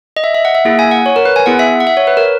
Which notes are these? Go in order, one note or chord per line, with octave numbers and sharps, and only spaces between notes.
D#5
E5
E5
F#5
E5
A#3 E4 G#4
G#5
F#5
C#5
A#4
B4
G#5
B3 E4 G#4 F#5
E5
F#5
E5
C#5
B4
A#4